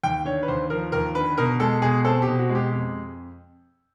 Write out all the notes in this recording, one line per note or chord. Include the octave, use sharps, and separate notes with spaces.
D#2 G5
D3 C#5
B4
D#2 C5
F3 A#4
D#2 A#4
D3 B4
B2 A#4
G#3 A4
B2 G#4
C4 A4
G4
B2
F#4
G#3
G4
F2